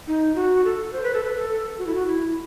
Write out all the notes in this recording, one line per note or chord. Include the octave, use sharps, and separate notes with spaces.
D#4
F#4
A4
C5
B4
A4
B4
A4
F#4
E4
F#4
E4